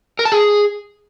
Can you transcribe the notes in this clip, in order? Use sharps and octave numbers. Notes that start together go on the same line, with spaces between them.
A#4
A5
G#4